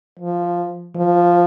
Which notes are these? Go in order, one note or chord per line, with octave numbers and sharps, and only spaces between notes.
F3
F3